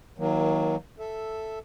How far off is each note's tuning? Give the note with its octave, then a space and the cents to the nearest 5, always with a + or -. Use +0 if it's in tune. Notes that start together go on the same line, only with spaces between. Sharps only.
D#3 +35 F#3 +0 A#3 +20
A4 +0 E5 +0